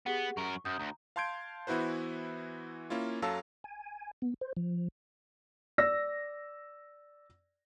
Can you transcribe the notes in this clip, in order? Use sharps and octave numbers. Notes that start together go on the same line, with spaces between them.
B3 G4 G#4 F#5
F#2 A#4 C#6
F#2 D#6 G6
D2 A#5
F5 A5 C6 G6 G#6 D7
E3 B3 E4 F#4 B4 C5
A#3 C#4 E4 F4
F#2 F#3 A4 F5 A5 E6
G#5
B3
C5
F3
D5 E6 A#6